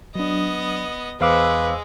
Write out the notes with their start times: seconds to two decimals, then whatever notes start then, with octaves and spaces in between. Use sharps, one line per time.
0.15 F#3 B3 D4 D#5
1.21 E2 G#3 B4 C5 F5 D6 E6